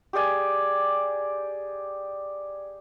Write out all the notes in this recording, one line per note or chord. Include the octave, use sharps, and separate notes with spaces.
G4 G#4 D5 G#5